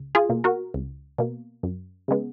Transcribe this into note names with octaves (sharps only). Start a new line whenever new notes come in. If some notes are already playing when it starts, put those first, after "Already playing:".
Already playing: C#2
F4 G#4
B2 A#3
F#4 A#4
C#2
B2 A#3
F#2
C#3 G#3 B3